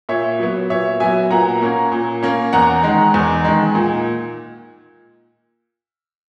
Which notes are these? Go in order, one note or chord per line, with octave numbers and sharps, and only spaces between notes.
A#2 C#5 E5
F#3 B3
A#2 C#5 E5
F#3 B3 E5 G#5
A#2 F#5 A#5
A#3 C#4
A#2
A#3 C#4
E2 F#5 A#5
D#3 G#3
E2
D#3 G#3
A#2